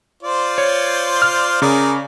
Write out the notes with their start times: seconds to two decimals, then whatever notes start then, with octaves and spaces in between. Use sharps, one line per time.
0.23 F4 C5 D5
0.58 C#5
1.22 F6
1.62 C#3 G#4 A#4 D5